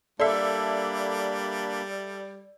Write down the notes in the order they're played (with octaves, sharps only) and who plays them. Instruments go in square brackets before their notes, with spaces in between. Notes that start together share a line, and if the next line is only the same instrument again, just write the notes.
[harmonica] G3 [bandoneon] A#3 D4 B5 [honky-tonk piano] A4 E5 [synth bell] D5